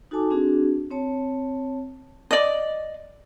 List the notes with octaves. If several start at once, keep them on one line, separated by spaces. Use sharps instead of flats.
D#4 F#4 A4 G#5 A5 D6
C4 D4 F#4 G#4
C4 C#5 A5
D5 D#5